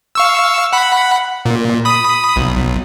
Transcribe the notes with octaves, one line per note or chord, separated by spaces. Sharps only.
F5 C#6 E6
F#5 B5
A#2
B5 D#6
B1